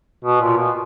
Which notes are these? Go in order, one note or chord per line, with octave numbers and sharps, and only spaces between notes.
B2
A#2
B2